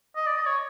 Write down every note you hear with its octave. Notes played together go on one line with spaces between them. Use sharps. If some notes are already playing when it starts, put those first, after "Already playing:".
D#5
D5
D#5
C#5